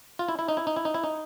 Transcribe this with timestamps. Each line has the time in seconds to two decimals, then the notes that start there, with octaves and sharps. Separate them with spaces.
0.19 F4
0.28 E4
0.39 E4
0.49 D#4
0.57 E4
0.67 D#4
0.76 E4
0.85 D#4
0.94 E4
1.04 D#4